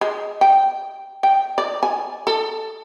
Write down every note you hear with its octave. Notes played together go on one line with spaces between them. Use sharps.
G#3
G5
G5
D5
G#5
A4